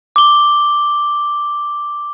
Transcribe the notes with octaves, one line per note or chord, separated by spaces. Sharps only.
D6 G7